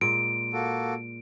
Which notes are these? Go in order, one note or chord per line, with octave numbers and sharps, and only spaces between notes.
A#2 G#3 D7
A#3 F#4 A4